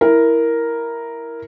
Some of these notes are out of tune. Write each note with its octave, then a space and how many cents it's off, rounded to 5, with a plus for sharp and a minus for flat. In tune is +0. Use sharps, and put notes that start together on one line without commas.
E4 +0 A#4 +0